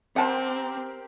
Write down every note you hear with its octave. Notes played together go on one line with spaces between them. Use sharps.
C4 G4 A#4 C5 F#5 A5